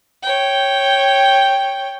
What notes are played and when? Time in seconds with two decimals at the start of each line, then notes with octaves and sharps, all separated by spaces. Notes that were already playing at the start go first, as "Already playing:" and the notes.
0.23 C#5 G5